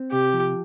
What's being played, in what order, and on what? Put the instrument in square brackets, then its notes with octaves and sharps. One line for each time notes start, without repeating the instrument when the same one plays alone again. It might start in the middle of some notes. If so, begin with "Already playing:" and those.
Already playing: [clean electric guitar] C4
[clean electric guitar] C3 [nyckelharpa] G4
[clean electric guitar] F3